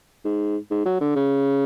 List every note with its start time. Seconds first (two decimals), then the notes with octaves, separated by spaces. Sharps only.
0.25 G#2
0.71 G#2
0.86 F#3
1.01 D3
1.16 C#3